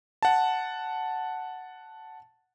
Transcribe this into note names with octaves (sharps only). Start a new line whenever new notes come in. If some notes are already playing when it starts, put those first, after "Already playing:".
F#5 A5